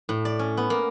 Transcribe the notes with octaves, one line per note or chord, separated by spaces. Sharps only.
A2
D5
C#4
B3
A#3